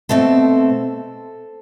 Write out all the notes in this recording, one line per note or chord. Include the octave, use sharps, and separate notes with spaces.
B2 A3 C4 A4 C5